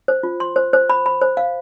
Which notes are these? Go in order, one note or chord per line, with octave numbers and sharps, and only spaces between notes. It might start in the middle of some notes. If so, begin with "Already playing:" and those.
C5
F4
C6
C5
C5
B5
B5
C5
F5